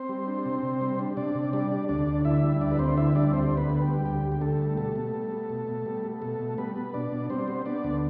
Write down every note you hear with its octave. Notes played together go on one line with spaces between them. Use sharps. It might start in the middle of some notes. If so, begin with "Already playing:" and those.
Already playing: C4 C5
G3
D4
C3
C3
G3
D4
C3 D4 D5
C3
G3 D4 D5
D4
D2 D4 D5
D2
D3 E4 E5
G3
D2 D4 D5
B4
D2 C4 C5
D3 E4 E5
G3 D4 D5
D2 C4 C5
D2
B3 B4
D3
G4
G3
D2 G4
D2
G4
D3 A3 A4
G3
B2 A3 A4
B2
G3
B3
B2
B2
G3
B3
B2 A3 A4
B2
G3 B3 B4
B3
B2 D4 D5
B2
G3 C4 C5
B3
B3 D4 D5
D2